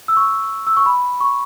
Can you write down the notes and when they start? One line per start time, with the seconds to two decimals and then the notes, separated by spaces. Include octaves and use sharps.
0.08 E6
0.17 C#6
0.67 E6
0.77 C#6
0.86 B5
1.21 C#6